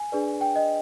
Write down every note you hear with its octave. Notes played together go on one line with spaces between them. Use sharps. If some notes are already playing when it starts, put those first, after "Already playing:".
Already playing: G#5
D4 G#4 B4 D5
G5
D#5